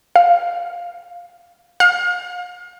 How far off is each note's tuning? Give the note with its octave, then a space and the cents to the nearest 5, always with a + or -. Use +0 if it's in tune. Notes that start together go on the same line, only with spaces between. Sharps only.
F5 +5
F5 +40